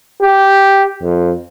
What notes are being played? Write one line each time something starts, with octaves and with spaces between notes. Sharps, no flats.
G4
F2